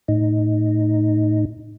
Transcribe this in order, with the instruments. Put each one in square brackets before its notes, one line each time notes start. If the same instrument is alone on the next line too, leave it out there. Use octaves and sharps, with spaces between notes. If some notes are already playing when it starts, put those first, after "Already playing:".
[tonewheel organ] A2 D#4